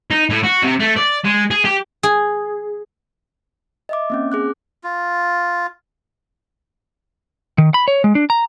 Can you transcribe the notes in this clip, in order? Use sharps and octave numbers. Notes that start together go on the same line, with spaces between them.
D#4
A2
F#4
C3
A3
D5
G#3
G#4
G4
G#4
D#5 E5 D6
A#3 C4 C#4
G#4 D6 F#6
F4
D#3
B5
C#5
G#3
D4
A#5